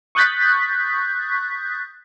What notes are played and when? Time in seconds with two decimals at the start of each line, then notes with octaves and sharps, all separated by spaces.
0.15 C#6 D#6 F#6 G6 A6 B6